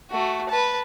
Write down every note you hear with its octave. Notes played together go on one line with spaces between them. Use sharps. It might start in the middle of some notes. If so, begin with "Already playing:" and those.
A3 F#4
B4 A5